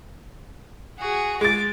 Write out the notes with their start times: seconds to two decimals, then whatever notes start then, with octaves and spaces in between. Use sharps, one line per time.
0.98 F#4 G#4
1.41 G#3 D6 A6